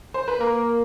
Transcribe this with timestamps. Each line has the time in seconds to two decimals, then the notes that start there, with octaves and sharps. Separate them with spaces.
0.14 C5
0.28 B4
0.39 A#3 A#4